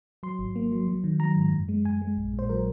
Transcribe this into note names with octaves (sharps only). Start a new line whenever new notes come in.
F#3 C6
G#1
A#3
F#3
F#3
D#3
F#3 A#5
G#2
F#2
G#3
F#2 G#5
G#3
A#1
A#2
C5
F#3 A#4